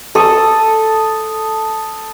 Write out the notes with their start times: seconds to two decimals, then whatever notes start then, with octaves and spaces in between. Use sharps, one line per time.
0.15 A4 D#6